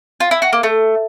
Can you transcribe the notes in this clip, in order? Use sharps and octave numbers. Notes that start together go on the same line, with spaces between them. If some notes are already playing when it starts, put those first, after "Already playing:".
F4
E4
F#4
A#3
A3